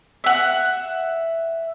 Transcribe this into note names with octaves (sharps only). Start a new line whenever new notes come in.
E5 F#5